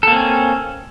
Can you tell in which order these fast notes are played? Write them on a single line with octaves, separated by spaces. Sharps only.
A4 A#3 C4 C#4